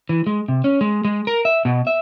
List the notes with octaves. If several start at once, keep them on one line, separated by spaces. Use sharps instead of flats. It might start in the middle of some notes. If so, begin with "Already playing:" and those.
E3
G#3
C3
C#4
G#3
G#3
A#4
E5
B2
E5